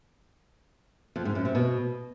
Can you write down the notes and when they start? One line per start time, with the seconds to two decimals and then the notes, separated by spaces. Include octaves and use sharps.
1.16 F2
1.25 G#2
1.35 F#2
1.45 C3
1.55 B2